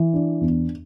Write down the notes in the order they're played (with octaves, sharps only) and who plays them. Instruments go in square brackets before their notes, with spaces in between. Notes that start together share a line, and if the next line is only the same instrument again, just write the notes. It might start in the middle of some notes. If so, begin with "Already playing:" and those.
Already playing: [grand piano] E3
D4
E2